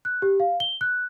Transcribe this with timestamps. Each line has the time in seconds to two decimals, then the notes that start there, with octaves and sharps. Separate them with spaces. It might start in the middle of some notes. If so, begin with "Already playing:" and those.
0.05 F#6
0.22 G4
0.40 F5
0.60 G7
0.81 F#6